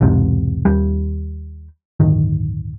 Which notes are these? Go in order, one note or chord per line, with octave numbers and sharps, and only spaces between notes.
B1 E2 G#2 C3
D#2 G3
D1 G1 D#3